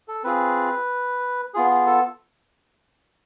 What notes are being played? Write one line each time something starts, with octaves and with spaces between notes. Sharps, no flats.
A4
C4 F4 G#4 B4
B3 F4 G#4
G#4
A4